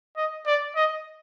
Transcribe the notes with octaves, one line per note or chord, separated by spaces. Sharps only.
D#5
D5
D#5